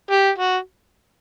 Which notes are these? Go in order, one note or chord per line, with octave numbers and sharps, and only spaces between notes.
G4
F#4